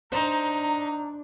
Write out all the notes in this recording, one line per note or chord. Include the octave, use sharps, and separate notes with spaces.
D4 D#4 C5 A#5